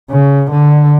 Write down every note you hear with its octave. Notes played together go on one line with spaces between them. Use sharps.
C#3
D3